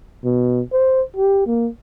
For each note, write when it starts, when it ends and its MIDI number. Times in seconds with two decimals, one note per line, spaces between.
0.24 0.61 47
0.73 1.02 72
1.17 1.43 67
1.47 1.68 58